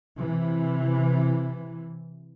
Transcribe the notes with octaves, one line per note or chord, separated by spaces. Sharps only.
C3 E3